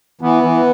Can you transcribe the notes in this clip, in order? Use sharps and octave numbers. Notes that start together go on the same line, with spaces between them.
E3 B3
E3